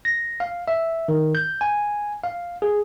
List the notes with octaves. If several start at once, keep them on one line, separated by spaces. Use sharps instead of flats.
A#6
F5
E5
D#3
G6
G#5
F5
G#4